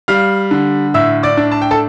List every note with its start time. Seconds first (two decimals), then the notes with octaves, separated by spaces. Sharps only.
0.08 G3 F5 F6
0.51 D3
0.94 A2 E5 E6
1.23 D5 D6
1.37 D4
1.52 A5
1.62 G5
1.71 A4 A5